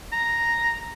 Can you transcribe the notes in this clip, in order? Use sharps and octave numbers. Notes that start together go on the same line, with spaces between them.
A#5